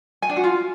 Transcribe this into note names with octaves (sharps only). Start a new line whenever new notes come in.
G#5
D4
F#4
F4